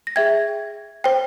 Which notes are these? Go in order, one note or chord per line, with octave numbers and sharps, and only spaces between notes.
A#6
G#4 E5 G5 G#6
C5 G5